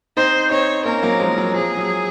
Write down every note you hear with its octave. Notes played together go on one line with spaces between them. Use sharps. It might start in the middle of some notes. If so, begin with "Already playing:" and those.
C4 D#4 C5
C4 D#4 C#5
A#3 C#4 A#4
F#3 A#3
F3 G#3
F#3
F3 G#4
F#3